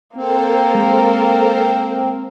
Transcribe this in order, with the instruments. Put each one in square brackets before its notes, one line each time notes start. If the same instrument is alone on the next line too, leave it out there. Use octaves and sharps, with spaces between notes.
[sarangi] A#3 [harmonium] C4 [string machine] A4 A#4 C5
[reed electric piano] G#3